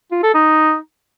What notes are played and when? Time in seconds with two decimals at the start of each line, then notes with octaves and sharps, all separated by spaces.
0.12 F4
0.23 A4
0.34 D#4